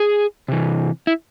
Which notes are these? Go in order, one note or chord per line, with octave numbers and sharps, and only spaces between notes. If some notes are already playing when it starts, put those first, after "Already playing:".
Already playing: G#4
C3 E3
E4